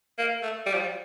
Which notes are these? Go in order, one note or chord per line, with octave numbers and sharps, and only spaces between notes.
A#3
A3
G3
F3
G3